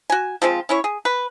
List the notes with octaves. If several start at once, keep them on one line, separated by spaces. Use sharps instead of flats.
F#4 G#5
F3 G#3 C4 F4
C#4 E4 C#5
G#4
B4